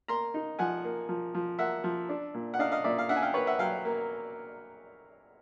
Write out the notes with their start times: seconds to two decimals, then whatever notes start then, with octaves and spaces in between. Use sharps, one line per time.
0.08 A#3 A#5 C6
0.34 D#4
0.59 F3 F#5 G#5
0.84 A#3
1.09 F3
1.35 F3
1.59 A#3 E5 F#5
1.84 F3
2.09 D4
2.34 A#2
2.54 F#5
2.59 D4 D#5 F5
2.72 D#5 F5
2.84 A#2 D5 E5
2.98 F5
3.09 D4 E5 F#5
3.16 G#5
3.22 F5 G5
3.34 A#3 B4 C#5
3.47 E5 F#5
3.59 F#3 F5 G5
3.85 A#3